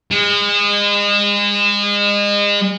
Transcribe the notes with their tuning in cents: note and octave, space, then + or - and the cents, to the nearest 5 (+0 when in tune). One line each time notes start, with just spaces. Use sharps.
G#3 -30